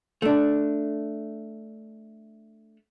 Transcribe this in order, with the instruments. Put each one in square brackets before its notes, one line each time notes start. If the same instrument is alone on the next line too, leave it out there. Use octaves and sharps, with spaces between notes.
[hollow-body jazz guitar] A3 D4